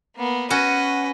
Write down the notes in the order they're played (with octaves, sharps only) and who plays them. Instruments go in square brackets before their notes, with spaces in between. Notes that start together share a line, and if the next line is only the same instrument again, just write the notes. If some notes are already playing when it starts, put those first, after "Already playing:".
[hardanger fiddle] A#3 B3
[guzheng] C#4 F#4 [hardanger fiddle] B4 D#5